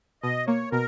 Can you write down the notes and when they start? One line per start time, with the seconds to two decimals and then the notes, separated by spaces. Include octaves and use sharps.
0.23 B2 D#5
0.47 A#3 C#5
0.72 B2 A#4